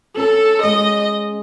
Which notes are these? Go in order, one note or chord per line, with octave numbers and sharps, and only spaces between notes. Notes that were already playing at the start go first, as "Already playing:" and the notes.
C#4 A4
G#3 D#5